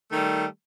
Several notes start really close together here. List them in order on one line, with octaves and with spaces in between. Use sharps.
A3 D#3 G3